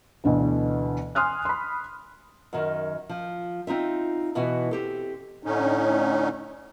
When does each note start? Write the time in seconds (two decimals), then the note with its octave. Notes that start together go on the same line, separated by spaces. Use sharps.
0.24 D2 B2 D3 E3
1.15 G#5 C6 D#6 F6 F#6
1.45 B5 C6
2.53 F#2 D#3
3.09 F3
3.67 C4 D#4 F4 E5
4.35 B2 E3 B3 F#4
4.71 C4 G4 A4
5.43 A2 D3 C#4 D#4